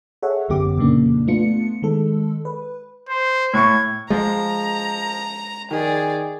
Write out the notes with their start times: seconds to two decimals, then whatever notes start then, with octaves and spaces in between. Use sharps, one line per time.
0.23 G#4 A4 C#5 E5 F#5
0.48 G#1 F#2 D3 B3 G4 D6
0.77 F2 A#2 C#3 A#3 D4
1.27 A3 B3 D4 F4 C#7
1.82 D#3 G#3 A4
2.45 B4
3.09 C5
3.54 A2 C#6 G#6
4.10 F3 G#3 A#5
5.71 D#3 G#4 D5